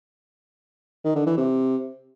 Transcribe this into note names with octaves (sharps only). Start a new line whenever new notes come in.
D#3
D3
E3
C3